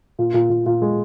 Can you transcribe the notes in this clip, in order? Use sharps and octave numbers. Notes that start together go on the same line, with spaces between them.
A#2
A#2
A#2
A#2
G#3